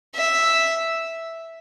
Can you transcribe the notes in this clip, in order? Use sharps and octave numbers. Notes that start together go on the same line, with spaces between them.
E5